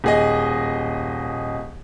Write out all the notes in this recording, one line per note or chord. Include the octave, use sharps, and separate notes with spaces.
D#1 G#4 D#5